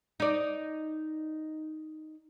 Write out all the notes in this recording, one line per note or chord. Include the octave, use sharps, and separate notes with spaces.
D#4 D5